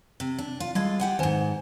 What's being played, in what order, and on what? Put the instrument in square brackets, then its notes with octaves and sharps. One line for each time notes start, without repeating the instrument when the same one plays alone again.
[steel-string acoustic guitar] C3
D4
F4
[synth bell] G3 G#6 [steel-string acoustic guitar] G#3 F4 A4
[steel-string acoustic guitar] G4 F#5 G#5
[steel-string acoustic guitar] F2 G#2 [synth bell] D#3 C5 G#5